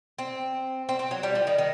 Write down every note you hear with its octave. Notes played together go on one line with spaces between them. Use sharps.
C4
C4
C4
F#3
G3
F3
D#3
D#3